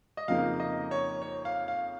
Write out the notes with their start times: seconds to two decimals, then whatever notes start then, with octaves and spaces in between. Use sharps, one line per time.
0.17 D#5
0.28 F2 C#3 F3 A#3 D#4 F5
0.60 D#5
0.91 C#5
1.22 C#5
1.45 F5
1.68 F5